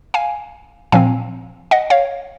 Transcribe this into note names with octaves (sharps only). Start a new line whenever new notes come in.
F5 G#5
A#2 F3 C4 F5 G#5
D#5 F#5
C#5 F5